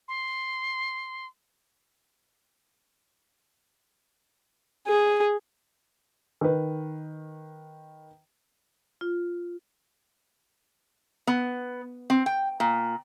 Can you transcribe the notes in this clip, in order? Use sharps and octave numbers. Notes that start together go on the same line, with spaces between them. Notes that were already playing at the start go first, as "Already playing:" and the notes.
C6
G#4
D#3 B4
F4
B3
C4
G5
A#2